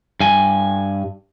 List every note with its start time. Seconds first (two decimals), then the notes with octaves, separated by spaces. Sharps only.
0.20 G2 G#5